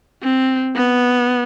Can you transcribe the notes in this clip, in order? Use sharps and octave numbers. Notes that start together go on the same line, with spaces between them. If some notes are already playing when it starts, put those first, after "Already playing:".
C4
B3